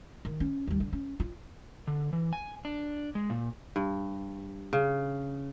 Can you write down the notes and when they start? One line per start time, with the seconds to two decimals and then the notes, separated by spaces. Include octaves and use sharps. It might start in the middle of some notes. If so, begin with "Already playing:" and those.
0.25 D#3
0.40 C#4
0.67 D#2 G3
0.80 D3
0.93 C#4
1.20 F4
1.87 D3
2.13 E3
2.33 G#5
2.65 D4
3.15 G#3
3.30 A#2
3.76 G2
4.73 C#3